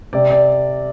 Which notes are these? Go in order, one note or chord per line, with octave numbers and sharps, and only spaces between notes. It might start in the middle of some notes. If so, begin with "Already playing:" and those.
C3 D5
D5